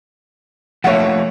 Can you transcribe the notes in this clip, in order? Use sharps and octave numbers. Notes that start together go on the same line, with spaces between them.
F3 A3 A#3 C#5 E5 F#5